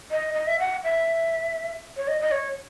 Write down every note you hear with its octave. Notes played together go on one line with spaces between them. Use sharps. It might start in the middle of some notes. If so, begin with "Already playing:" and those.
D#5
D#5
E5
F#5
E5
C#5
D#5
D#5
C#5